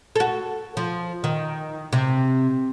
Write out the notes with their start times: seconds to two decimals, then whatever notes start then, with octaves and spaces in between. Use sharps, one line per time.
0.16 F#4 A4
0.77 F3
1.24 D#3
1.93 C3